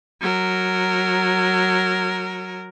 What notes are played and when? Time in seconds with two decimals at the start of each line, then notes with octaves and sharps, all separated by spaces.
0.21 F#3 A#4